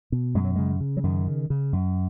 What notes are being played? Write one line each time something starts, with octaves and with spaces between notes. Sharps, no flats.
B2
F#2 G#3
F#3
C#3 G#3
C#3
F#3
F#2 D#3
C#3
C#3
F#2